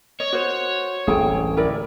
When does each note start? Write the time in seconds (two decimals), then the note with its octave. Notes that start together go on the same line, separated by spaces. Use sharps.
0.20 C#5 D#5
0.33 F#4 C5
1.07 D1 A1 G3 G#4 A4 G5
1.57 E4 A#4 D5